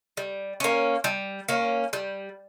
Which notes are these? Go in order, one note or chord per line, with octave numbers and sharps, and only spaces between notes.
G3
A#3 C#4
G3
A#3 C#4
G3